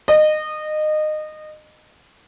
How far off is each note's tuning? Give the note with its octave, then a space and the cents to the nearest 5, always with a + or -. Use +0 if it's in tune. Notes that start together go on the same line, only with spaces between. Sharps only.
D#5 -20